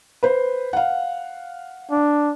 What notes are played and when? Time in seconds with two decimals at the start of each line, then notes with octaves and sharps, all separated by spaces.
0.23 B4 C5
0.73 F5 F#5
1.91 D4